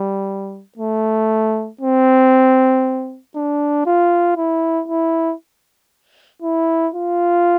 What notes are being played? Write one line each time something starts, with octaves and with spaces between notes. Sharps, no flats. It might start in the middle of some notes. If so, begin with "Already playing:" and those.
Already playing: G3
A3
C4
D4
F4
E4
E4
E4
F4